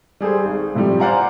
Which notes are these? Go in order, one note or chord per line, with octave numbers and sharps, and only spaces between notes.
G3 G#4 A4 C5
G#1
A2 C3 F3 G3
C5 D5 F5 F#5 G#5 A#5